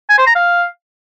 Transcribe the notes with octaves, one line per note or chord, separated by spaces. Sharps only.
G#5
C5
A#5
F5